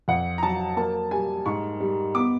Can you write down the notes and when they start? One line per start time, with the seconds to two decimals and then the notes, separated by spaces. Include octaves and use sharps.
0.08 F2 F#5
0.38 A#5
0.43 F#3 A5
0.77 A#3 A5
1.11 G3 G#5
1.46 G#2 C#6
1.80 G3
2.15 B3 D6